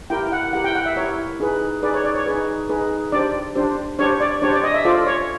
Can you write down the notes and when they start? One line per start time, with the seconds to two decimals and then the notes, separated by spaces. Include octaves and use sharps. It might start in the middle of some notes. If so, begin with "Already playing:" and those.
0.10 E4 G4 A#4 G5
0.32 F#5
0.53 E4 G4 A#4 F#5
0.64 G5
0.75 F#5
0.86 E5
0.96 E4 G4 A#4 C#5
1.40 D#4 G#4 B4
1.83 D#4 G#4 B4 D5
1.94 C#5
2.05 D5
2.15 C#5
2.26 D#4 G#4 B4
2.69 D#4 G#4 B4
3.12 D4 G4 C5 D5
3.56 D4 G4 C5
3.99 D4 G4 C5 C#5
4.21 D5
4.42 D4 G4 C5 C#5
4.53 D5
4.64 D#5
4.74 E5
4.85 F4 A4 C5 D5
5.07 C#5